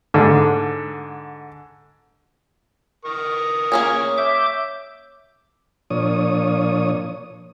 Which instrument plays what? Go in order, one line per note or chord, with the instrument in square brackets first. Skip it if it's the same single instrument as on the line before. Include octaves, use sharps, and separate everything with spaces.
[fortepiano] G#2 D3
[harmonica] A#4 C#6 D#6
[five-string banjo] A#3 C#4 G#4 [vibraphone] C#5
[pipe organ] E5 D6 G6
[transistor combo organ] A#2 F3 D4 C#5 D#6